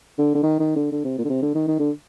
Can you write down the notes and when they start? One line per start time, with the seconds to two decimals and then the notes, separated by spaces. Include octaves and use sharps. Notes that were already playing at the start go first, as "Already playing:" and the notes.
0.18 D3
0.35 D3
0.43 D#3
0.60 D#3
0.76 D3
0.92 D3
1.04 C3
1.18 A#2
1.24 D3
1.29 C3
1.42 D3
1.55 D#3
1.68 D#3
1.79 D3